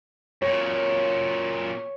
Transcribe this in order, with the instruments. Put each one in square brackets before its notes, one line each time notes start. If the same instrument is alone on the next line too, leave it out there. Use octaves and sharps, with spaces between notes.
[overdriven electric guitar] F#2 A#2 [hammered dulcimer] C#5